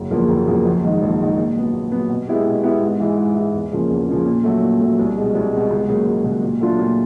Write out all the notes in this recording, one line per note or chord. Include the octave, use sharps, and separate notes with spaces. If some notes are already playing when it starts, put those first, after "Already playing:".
Already playing: F#1
E2 C#3 F3 A#3
F#1
E2 C#3 F3 A#3
A#1
G#2 D#3
A#1
G#2 D#3
A#2
F#3 B3
A#2
F#3 B3
B2
G#3 B3 E4 G4
B2
G#3 B3 E4 G4
G#2
E3 G#3
G#2
E3 G#3
E2
C#3 F3 A#3 C#4
E2
C#3 F3 A#3 C#4
A#2
F#3 A3
A#2
F#3 A3
C2
B2 G#3
C2
B2 G#3
C#2
C#3 F#3 A#3
C#2
C#3 F#3 A#3
A#2
F#3 A3 D4 F4
A#2